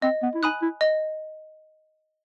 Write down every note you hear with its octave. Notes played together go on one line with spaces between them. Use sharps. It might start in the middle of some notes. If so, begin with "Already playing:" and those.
C4 D#5
B3
E4
D#4 G#5 B5 D#6 F#6
E4
D#5